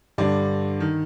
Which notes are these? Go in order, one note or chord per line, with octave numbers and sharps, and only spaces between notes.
G2 D3 D5
D#3